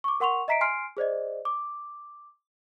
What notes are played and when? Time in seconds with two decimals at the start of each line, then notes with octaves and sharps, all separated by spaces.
0.04 C#6 D6
0.20 A#4 F#5 C6 C#6 F7
0.48 D#5 E5 A#5 B6 C7 D7
0.61 G#5 C6 F6 C7 D7
0.97 G#4 C5 D5 D#5
1.45 D6